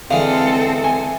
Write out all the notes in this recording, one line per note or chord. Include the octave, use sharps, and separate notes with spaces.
D3 E3 G#3 C4 A4 F5
G#5